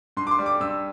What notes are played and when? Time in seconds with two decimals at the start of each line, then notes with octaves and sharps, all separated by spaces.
0.17 G2 C6
0.27 D6
0.31 C6
0.39 G3
0.46 D6
0.61 G2 E6